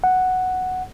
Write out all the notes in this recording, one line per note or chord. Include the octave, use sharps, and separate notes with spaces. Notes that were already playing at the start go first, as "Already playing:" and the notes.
F#5